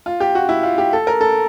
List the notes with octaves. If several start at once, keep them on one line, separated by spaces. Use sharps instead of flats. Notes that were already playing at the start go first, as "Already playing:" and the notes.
F4
G4
F#4
E4
F4
G4
A4
A#4
A4